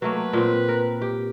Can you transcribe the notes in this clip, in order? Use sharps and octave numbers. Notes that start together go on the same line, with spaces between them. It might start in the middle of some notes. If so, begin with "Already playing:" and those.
F#3 A3 A#3 B4
A#2 C4
A#4
G4